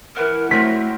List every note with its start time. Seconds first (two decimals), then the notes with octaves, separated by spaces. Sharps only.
0.17 E3 A#4 F#5
0.51 F#3 A3 C4 A#4 B6